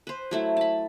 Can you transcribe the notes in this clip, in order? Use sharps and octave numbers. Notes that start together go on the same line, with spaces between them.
B4 C5
F#3 A3 E4
A5 B5